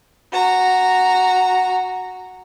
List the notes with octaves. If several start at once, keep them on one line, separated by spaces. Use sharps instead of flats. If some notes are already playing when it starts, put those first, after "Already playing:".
F#4 A#5